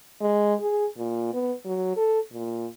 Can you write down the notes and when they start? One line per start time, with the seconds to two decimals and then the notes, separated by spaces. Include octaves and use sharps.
0.21 G#3
0.61 G#4
0.98 A#2
1.34 B3
1.65 F#3
1.97 A4
2.33 A#2